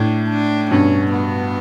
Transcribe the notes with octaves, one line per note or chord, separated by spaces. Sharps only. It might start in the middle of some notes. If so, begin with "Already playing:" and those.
Already playing: A2 D4
D4
G2 B2 C#4
B3